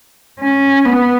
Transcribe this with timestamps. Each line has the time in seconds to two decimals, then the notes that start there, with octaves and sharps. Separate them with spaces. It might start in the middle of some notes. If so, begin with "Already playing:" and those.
0.40 C#4
0.86 B3